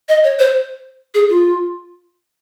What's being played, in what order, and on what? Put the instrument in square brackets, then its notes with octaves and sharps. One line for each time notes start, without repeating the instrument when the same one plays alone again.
[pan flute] D#5
C#5
C5
G#4
F4